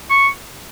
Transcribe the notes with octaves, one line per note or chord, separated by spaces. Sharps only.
C#6